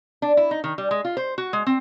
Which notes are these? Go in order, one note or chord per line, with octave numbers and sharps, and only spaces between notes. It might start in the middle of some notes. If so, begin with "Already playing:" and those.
D4
E4
D#4
D#3
G3
G#3
F4
C5
F#4
G#3
C4